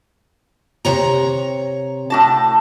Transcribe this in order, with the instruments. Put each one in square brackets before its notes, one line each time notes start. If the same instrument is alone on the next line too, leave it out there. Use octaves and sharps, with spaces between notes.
[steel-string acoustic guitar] C3 C#5 A#5
[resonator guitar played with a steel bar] A2 F#4 A5